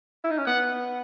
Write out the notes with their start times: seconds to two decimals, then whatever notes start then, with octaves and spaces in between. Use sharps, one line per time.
0.24 E4
0.31 D#4
0.38 C#4
0.46 B3 F#5